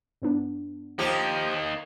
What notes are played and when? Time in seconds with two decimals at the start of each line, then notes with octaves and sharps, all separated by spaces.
0.22 G2 B3 D4
0.99 F3 A#3 D#4 G4